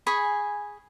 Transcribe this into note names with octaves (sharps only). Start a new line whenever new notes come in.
G#4 G#5 B5 C#6